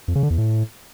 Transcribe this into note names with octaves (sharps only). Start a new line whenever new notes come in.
F2
C#3
D3
E2
A2